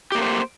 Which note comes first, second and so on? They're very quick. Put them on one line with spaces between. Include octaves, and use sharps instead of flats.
G4 A#3 A3 C5